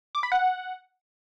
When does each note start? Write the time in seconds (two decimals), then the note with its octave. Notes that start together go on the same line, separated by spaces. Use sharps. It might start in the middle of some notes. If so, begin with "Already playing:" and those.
0.15 D6
0.23 B5
0.32 F#5